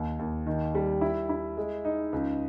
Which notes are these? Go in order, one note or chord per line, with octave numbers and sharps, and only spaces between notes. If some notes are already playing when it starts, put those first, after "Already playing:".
Already playing: D#2
D#2
D#3
G3
E4
E4
G#3
D#4
C#2